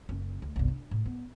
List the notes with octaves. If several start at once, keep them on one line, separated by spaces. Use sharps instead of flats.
F#1 C#4
D2
G1 C2
D4
A2
B3